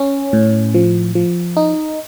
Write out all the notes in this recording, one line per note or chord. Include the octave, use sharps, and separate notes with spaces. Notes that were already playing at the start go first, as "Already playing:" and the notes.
Already playing: C#4
A2
F3
F3
D#4